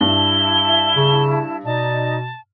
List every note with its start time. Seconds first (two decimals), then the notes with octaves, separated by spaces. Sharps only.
0.01 G2 E4 A5 G7
0.96 C#3
1.65 B2 D#4 D5 D#5 A5